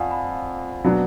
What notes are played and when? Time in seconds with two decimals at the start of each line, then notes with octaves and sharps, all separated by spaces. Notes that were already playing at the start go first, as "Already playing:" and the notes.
Already playing: F2 D5 F5 F#5 G#5
0.11 G#5 B5
0.84 B2 F#3 B3 D4